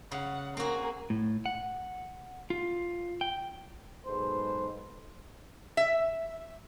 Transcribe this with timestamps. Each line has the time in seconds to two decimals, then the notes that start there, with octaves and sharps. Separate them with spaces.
0.12 C#3 F#5
0.57 A#3 C4 F#4 G#4 A#4
1.10 A2
1.46 F#5
2.50 F4
3.21 G5
4.07 B1 G#2 G#3 A4 B4 C5
5.77 E5